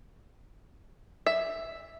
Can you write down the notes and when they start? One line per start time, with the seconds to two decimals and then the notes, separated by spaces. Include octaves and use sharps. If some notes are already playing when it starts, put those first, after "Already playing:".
1.26 E5